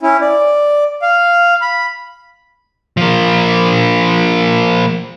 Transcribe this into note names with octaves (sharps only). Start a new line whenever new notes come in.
C#4 E4
D5
F5
B5
F3 A#3